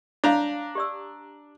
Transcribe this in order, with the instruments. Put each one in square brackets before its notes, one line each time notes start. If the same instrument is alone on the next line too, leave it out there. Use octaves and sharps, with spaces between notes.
[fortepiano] D4 A#5 [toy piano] C#5 F5
[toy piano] G4 D5 E6